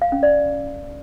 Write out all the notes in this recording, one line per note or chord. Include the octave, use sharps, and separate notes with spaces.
F5
C#4
D5